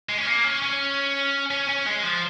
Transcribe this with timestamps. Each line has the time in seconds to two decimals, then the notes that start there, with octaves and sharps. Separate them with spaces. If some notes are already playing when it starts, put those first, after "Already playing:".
0.09 G#3
0.18 C#4
0.27 A#3
0.44 C#4
0.62 C#4
1.51 C#4
1.69 C#4
1.86 G#3
2.03 F3